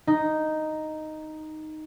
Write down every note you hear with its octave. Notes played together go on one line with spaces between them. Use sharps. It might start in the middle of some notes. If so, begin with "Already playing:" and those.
D#4